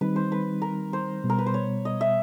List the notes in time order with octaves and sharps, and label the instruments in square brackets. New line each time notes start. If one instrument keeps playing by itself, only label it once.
[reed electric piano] D#3 G3 C4 D#4 [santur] B4
[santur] C5
B4
A#4
C5
[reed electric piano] B2 G3 B3
[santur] A#4
B4
C5
C#5
D#5
E5